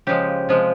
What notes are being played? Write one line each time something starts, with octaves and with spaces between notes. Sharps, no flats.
C#3 F3 G#3 G4
C3 F3 G#3